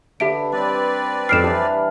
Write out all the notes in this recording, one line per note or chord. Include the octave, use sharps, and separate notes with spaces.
D3 D4 G4 B4 E5 D7
G3 C4 B4 D5
F2 F6 C7 D7 E7
E3 D4 G4